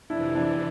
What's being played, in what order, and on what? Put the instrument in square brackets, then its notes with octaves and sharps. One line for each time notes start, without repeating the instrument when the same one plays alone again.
[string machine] F2 C3 E3 [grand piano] D4 E4
[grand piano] D4 E4